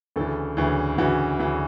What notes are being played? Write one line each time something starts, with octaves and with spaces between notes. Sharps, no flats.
D2 C#3 E3 A4
D2 C#3 E3
D2 C#3 E3 F#4
D2 C#3 E3